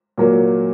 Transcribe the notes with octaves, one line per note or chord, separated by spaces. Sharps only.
A#2 F#3 A#3